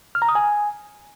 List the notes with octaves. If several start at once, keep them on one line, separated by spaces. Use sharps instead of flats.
F6
A#5
D#6
G#5